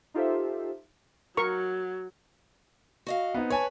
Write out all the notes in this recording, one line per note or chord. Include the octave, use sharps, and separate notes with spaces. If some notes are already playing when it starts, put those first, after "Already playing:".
D#4 F4 G4 A4 C5 E5
F#3 A#4 C#6
F#4 D#5 F5
B3 C4 D#4
B4 C#5 G#5 A5